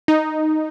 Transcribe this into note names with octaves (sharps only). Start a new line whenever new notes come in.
D#4